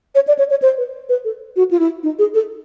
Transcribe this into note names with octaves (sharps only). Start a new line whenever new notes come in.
C#5
D5
C#5
C#5
C5
B4
B4
A4
F#4
F4
E4
D#4
G#4
A4